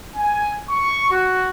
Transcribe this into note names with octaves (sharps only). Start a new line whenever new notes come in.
G#5
C#6
F#4